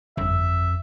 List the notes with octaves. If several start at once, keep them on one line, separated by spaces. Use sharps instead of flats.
G1 F2 E5